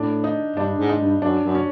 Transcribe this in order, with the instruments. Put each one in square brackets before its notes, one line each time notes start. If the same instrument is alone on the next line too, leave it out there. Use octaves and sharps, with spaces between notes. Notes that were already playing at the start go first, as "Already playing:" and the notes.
Already playing: [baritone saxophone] A2 [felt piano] D4
[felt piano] D#4
[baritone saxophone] G2 [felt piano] D4
[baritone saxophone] G#2
[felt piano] D#4
[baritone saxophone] G2
[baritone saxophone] F#2 [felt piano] D4
[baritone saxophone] F#2
[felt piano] C#4